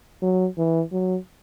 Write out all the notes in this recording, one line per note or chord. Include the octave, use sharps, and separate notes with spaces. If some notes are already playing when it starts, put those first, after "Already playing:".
F#3
E3
F#3